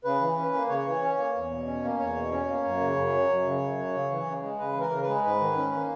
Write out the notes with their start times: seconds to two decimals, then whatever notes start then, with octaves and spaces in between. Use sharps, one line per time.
0.04 C#3 B4
0.21 E3
0.37 C#4
0.53 A#3
0.69 C#3 C#5
0.86 E3
1.02 C#4
1.18 A#3
1.35 E2
1.51 B2
1.67 C#4
1.84 A#3
2.00 E2 C#5
2.16 B2
2.31 C#4
2.48 A#3
2.64 F#2
2.80 C#3
2.96 F#2
3.14 F#3
3.29 F#2
3.45 C#3
3.61 F#2
3.78 F#3
3.94 C#3
4.10 E3
4.27 C#3
4.43 G#3
4.59 C#3 B4
4.75 E3
4.80 A#4
4.91 C#3
5.02 B4
5.08 G#3
5.24 G#2 B4
5.40 D#3
5.57 C#4
5.72 A#3